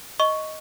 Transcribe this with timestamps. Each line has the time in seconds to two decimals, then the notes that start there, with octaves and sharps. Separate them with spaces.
0.20 D#5 C#6